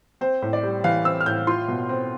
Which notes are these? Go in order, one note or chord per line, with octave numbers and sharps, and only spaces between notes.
C4 C5
A2
D5
G3
E3 F5
C4 E6
F6
A2 G6
F4 C6
B2
C4